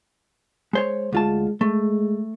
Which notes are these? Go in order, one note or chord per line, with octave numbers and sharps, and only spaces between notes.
G#3 C5 C#5
D2 G#3 F4 A5
G#3 A3